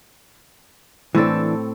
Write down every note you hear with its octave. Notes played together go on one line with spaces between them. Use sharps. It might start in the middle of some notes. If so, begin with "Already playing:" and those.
A2 E3 C4 D4 A4